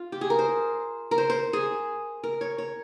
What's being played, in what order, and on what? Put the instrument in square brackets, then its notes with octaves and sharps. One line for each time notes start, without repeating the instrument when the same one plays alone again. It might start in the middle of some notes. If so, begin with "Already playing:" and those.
Already playing: [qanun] F4
G4
G#4
A#4
C5
A#4
C5
C5
G#4
A#4
C#5
C#5